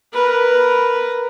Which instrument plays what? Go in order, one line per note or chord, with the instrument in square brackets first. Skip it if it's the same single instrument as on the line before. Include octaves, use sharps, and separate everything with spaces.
[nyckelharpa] A#4 B4